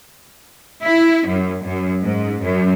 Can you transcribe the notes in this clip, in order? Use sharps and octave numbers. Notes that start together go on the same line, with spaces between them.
E4
F#2
F#2
G#2
F#2